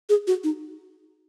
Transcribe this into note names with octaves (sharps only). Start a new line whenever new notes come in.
G#4
F#4
D#4